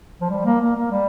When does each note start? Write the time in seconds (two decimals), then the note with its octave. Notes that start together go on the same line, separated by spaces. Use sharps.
0.21 F3
0.30 G3
0.45 A#3
0.61 A#3
0.76 A#3
0.91 G3